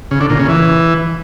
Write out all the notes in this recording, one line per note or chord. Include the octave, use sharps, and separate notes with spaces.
C#3
D3
A#2
C#3
E3